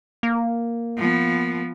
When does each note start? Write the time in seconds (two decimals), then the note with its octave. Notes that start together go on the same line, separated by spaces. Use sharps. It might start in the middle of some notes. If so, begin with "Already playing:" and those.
0.23 A#3
0.97 F3 B3